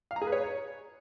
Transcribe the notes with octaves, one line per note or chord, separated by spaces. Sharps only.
F5
A#5
G#4
B4
C#5